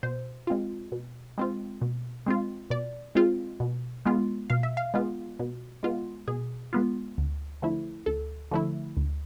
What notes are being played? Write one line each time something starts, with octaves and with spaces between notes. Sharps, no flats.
B2 C5
G#3 C4 F4
B2
G#3 C4 F4
B2
G#3 C4 F4
B2 D5
G#3 C4 F4
B2
G#3 B3 F4
B2 F5
E5
F5
G#3 B3 F4
B2
G#3 B3 F4
B2 G#4
G#3 B3 F4
D2
D3 F3 A3 E4
D2 A4
D3 F3 A3 E4
D2